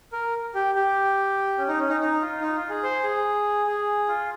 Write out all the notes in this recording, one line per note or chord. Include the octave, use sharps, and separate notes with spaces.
A#4
G4
G4
C#4
D#4
C#4
D#4
D#4
F4
D#4
F4
G#4
C5
G#4
G#4
F4